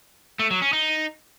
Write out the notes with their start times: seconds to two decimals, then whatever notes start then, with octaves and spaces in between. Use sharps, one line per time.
0.39 A3
0.51 F#3
0.62 C#4
0.73 D#4